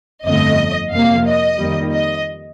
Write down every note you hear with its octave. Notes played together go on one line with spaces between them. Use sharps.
G1 F2 D3 A3 D#5
F2 C3 F3 A#3 F5
D#5
F2 D#3 G3 A#3
D#5